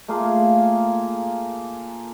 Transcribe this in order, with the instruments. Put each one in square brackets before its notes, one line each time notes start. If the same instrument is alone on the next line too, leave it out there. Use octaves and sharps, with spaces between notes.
[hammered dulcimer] A3 A#3 F4 G#4